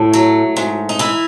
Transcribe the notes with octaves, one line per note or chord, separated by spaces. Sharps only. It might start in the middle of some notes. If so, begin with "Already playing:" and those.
Already playing: A2 A3
F#3
G#2
D#4
E3 E4